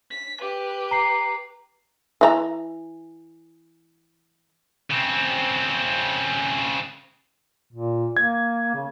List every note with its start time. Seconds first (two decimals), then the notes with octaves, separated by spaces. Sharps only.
0.10 B6
0.41 G4 B4
0.91 A#5 C7
2.21 E3 F4 A#5
4.90 C#3 C4
7.73 A#2
8.17 A#3 G#6
8.75 C#3